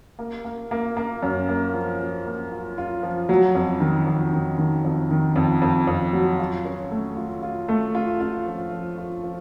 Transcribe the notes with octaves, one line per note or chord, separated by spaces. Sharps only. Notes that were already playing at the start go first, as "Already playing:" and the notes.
A#3
A#3
A#3
A#3
F#2
A#3
F3
F3
A#3
F4
F4
F3
F#3
F2
D#3
F2
D#3
D#3
F2
D#3
F2
F2
F2
F#3
F4
C#4
A3
F4
F4
A3
F4
F4
F3
F3
F4
F3